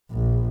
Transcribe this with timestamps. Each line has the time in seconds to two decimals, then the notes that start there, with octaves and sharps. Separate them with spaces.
0.11 A#1